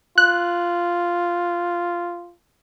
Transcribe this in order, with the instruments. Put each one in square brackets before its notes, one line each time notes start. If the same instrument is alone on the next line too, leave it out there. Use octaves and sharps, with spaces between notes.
[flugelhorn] F4 [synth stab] F#6